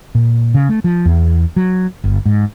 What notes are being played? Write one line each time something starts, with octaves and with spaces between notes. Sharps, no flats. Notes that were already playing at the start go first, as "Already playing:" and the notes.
A#2
C#3
A3
F3
E2
F#3
G1
G#2